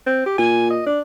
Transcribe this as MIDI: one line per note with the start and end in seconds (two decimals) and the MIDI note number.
0.06 0.22 60
0.26 0.34 67
0.38 0.86 46
0.38 0.70 80
0.70 0.83 75
0.86 1.00 62